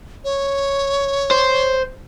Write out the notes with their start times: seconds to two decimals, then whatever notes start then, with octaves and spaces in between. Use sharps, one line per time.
0.24 C#5
1.31 C5